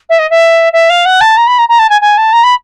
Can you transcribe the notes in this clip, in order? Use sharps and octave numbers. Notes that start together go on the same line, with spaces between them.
E5
D#5
E5
E5
F5
F#5
A5
A#5
B5
A#5
A#5
A5
G#5
G#5
A5
A#5
B5